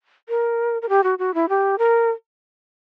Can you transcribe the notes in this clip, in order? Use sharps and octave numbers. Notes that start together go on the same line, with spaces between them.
A#4
A#4
G4
F#4
F#4
E4
G4
A#4